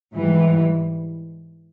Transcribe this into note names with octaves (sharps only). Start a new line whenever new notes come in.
G#2 E3 G3